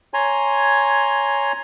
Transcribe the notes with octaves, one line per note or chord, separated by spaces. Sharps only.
C#5 G#5 A#5 C6